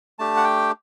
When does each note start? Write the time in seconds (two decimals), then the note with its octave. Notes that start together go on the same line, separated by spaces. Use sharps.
0.19 A3 D4 G4 A5
0.37 F#5
0.44 G5